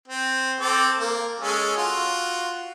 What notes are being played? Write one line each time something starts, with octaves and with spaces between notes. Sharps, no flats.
C4
C4 A4 D6
A#3
G#3 C#4 A4
F4 F#4